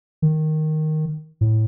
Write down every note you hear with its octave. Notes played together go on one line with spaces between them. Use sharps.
D#3
A2